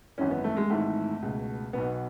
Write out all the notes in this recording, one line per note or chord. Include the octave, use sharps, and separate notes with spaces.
G#1 F#2 E3 C#4
B3
A3
G#3
G#1 G#2 E3 A3
C#2 B2
B1 B2 B3